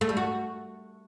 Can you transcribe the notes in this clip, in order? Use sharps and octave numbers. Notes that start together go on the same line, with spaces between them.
A3
G3
F#4